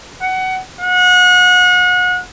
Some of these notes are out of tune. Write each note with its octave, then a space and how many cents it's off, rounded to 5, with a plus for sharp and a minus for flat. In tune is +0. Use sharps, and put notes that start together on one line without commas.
F#5 +20
F#5 -35